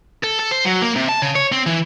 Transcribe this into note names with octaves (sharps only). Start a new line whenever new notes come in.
A4
A4
C5
F#3
A#3
C3
A5
C#3
C#5
C4
E3